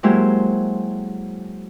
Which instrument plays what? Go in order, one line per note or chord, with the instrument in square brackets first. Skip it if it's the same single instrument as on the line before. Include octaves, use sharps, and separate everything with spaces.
[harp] F#3 G#3 A#3 E4 G4 C5